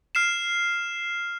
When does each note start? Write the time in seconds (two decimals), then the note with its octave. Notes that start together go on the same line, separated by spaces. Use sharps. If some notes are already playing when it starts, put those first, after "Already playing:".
0.15 F6 C7 E7